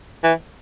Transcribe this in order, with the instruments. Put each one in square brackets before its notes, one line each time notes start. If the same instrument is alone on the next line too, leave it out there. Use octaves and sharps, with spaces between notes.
[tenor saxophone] E3